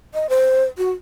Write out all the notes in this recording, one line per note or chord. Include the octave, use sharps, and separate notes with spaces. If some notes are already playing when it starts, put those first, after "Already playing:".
D#5
C5
F#4